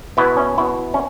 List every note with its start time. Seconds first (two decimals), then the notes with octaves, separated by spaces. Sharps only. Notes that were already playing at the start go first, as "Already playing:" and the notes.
0.17 B2 B3 E4
0.37 C#4
0.58 B2 B3 E4
0.94 C#4